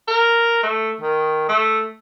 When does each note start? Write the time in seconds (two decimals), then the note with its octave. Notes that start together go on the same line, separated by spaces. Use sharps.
0.08 A#4
0.63 A3
1.01 D#3
1.49 A3